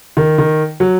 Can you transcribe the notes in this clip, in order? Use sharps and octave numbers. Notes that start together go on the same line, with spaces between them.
D#3
D#3
F#3